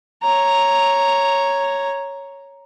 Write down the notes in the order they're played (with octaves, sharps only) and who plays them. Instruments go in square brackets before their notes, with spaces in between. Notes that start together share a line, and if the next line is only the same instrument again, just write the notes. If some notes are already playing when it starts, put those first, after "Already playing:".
[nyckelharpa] C#5 A#5